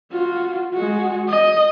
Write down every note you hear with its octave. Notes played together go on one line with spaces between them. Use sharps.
F4 F#4
G#3 F#4
D#5